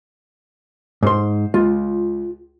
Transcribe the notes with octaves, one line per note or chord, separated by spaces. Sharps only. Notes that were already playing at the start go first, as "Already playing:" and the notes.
G#2 C5 C6
C#2 F4